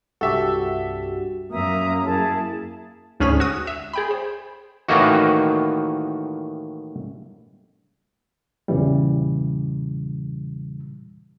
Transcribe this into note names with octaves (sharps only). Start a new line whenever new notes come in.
C2 G2 F#4 G4 A4 E5 E6
F#2 A#3 E5 A#5 D#6
E4 G#4 A5
G#1 D2 C#4 G#4 B5 F6
F#4 D#6
E5
G#4 G5 B5
C5
A2 D#3 E3 A#3 D#4 F#4
E2 A#2 C#3 E3 G3